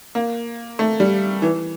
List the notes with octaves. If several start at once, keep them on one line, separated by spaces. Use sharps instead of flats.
A#3
A3
G3
E3